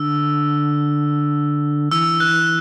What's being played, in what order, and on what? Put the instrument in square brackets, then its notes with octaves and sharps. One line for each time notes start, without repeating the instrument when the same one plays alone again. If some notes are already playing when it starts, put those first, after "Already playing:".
Already playing: [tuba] D3 [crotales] E6
[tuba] E3 [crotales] E6
[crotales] F#6